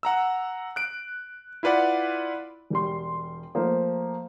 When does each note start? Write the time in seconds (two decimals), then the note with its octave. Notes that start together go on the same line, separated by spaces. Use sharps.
0.03 F#5 A#5 E6
0.76 F#6 D7
1.63 E4 F4 B4 D5 F#5
2.70 E1 G3 C6
3.55 F3 A3 A#3 C5